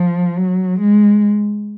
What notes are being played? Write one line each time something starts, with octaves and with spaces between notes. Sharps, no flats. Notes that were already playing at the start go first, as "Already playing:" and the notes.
Already playing: F3
F#3
G#3